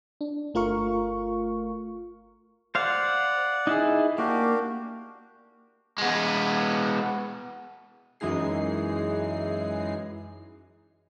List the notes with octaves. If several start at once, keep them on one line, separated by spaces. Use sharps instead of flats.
D4
G1 A3 F4 A#4 F5 C#6
C5 D5 F5 F#5
D#4 E4 G#4
A#3 D4 F#4 G4
G#3 B3
F#2 E3 G#3 D#4 G#4 C7